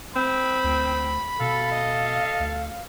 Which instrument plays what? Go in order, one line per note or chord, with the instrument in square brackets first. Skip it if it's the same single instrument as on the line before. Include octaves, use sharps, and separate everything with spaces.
[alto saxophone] C4 [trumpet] B5
[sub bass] D2
[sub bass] B2 [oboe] A4 [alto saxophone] F5
[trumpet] D#5
[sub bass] D2